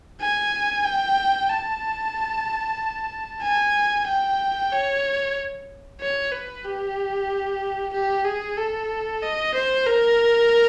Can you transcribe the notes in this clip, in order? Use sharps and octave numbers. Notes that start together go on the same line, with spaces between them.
G#5
G5
A5
G#5
G5
C#5
C#5
B4
G4
G4
G#4
A4
D#5
C5
A#4